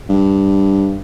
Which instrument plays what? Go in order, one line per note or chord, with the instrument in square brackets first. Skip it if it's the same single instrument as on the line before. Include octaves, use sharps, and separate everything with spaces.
[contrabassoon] G2